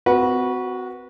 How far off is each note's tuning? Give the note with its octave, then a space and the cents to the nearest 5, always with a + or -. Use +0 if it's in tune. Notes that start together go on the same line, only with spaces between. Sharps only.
C4 -40 F#4 +0 B4 -30